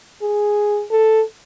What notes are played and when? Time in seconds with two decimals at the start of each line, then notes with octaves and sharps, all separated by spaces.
0.22 G#4
0.91 A4